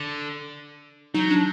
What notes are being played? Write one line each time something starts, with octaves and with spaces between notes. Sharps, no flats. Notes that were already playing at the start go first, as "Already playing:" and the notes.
Already playing: D3
F#3 D#4
D4